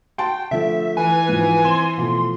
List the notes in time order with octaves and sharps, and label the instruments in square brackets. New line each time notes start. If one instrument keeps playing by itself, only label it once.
[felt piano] F#4 A5 C6 [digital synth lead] G5
[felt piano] D3 F3 A3 [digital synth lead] E5
[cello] E3 [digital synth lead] B4 [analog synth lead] G#5
[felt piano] G#2 F3
[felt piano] C4 E7 [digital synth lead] C6
[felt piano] B2 F3 A3